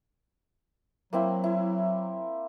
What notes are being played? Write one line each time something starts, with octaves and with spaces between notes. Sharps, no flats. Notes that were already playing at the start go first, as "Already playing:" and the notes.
F#3 A#3 C4 E4
E4